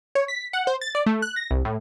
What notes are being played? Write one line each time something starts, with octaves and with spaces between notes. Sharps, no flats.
C#5
B6
F#5
C5
A6
D5
A3
F#6
A#6
C2
A2